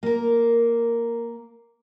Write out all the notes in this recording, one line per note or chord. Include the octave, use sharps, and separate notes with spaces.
A#3 A#4